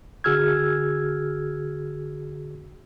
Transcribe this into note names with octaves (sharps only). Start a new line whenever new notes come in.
D3 F#4 G#4 E6 F6 G#6